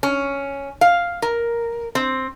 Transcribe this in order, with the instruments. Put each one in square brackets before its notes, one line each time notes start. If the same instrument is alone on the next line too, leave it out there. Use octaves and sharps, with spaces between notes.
[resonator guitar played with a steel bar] C#4
F5
A#4
C4